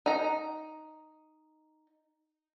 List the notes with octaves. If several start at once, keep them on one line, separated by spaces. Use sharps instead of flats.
D#4 A#5